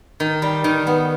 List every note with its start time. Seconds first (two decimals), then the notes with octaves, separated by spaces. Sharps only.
0.20 D#3
0.42 G3
0.64 D#3
0.87 B3